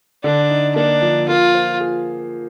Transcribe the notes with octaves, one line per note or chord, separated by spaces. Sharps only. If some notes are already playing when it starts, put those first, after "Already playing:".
D3 D4
D#4
A#3 D4
F3
A#3 F4
C5
G#4